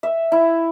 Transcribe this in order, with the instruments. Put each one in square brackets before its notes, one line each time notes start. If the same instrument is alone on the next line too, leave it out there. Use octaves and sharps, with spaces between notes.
[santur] E5
E4